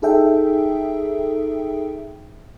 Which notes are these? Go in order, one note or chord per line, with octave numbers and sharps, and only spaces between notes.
D#4 G#4 A4 E5 G5